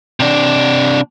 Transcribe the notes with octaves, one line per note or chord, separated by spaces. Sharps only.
C3 D4